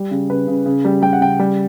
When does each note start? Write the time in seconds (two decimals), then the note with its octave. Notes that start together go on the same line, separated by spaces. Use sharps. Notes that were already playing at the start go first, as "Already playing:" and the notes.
Already playing: G3
0.11 C#3
0.30 C#3 B4
0.48 C#3
0.66 C#3
0.85 G3
1.02 G3 G5
1.13 F#5
1.21 C#3 G5
1.40 G3